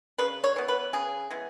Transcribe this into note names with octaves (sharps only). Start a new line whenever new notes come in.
C#3 B4
C#5
E3 B3
B4
C#3 G#4
E3 G#3 B3